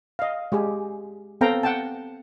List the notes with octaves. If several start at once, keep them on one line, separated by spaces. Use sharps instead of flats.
D#5 F5
G#3 G4 G#4
B3 C4 A4 F5 G5 A#5
F#5 G5 A5